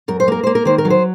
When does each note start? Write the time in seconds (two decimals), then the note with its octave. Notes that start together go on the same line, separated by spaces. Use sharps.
0.08 F#2 A#4
0.20 C5
0.28 A#3 A#4
0.43 A#3 C5
0.55 A#4
0.65 D#3 C5
0.78 A#4
0.85 F#3
0.90 C5